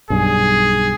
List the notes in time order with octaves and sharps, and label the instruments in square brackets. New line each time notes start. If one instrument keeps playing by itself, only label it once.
[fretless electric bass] B1 G2 [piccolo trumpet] G#4